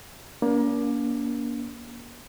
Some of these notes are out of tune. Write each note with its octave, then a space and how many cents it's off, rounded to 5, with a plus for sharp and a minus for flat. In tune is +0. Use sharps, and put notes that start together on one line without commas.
A#3 +25 D4 -45